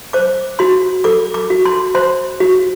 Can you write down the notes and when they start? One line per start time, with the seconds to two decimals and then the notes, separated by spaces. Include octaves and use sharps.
0.13 C5 D6
0.59 F#4 C6
1.04 A4 D6
1.34 D6
1.50 F#4
1.65 C6
1.95 C5 C6
2.40 F#4